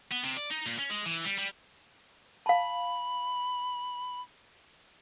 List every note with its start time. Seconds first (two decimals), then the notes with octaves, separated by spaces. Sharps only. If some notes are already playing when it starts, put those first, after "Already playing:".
0.11 B3
0.24 C3
0.37 D5
0.50 D#4
0.66 A#2
0.79 C#4
0.90 G#3
1.06 E3
1.25 G3
1.38 G3
2.46 F5 A5 B5